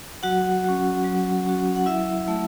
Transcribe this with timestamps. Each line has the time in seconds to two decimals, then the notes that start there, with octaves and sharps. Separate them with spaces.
0.23 F#3 F#4 F#5
0.64 C#4 F#4
1.05 F#3
1.46 C#4 F#4
1.76 F#5
1.86 F#3 E4 E5
2.27 A3 E4